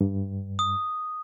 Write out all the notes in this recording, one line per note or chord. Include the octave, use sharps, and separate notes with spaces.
G2
D#6